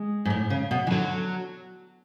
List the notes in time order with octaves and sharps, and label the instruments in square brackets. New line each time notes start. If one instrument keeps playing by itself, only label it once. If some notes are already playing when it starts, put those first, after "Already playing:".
Already playing: [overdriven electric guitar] G#3
[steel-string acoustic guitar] G#2
A2
C#3
B2
E3
[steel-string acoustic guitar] D3 [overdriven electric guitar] F#3